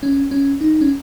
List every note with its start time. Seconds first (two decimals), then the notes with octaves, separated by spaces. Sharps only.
0.03 C#4
0.31 C#4
0.61 D#4
0.81 C#4